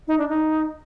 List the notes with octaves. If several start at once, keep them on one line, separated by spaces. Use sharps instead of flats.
D#4
D4
D#4